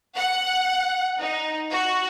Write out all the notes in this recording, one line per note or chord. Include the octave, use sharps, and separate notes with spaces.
F#5
D#4
F#4